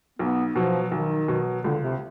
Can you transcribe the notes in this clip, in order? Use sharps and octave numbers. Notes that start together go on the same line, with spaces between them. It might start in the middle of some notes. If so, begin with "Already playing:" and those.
B1 B3
B2 F3 F#3
B1 D#3
B2 F#3
C#2 D3
C3